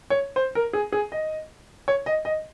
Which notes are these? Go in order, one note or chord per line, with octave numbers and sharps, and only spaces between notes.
C#5
C5
A#4
G#4
G#4
D#5
C#5
D#5
D#5